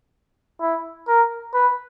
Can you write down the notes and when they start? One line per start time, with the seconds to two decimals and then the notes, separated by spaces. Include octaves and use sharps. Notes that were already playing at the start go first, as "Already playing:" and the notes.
0.61 E4
1.08 A#4
1.54 B4